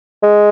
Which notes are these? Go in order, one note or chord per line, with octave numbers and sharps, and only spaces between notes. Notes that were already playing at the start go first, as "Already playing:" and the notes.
G#3